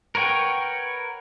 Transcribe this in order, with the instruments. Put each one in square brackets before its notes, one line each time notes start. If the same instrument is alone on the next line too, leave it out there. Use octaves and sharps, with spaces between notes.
[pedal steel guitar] A#4 B4 C#5 F#5 G5